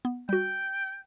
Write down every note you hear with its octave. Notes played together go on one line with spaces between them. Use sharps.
B3
G3 F#4 G5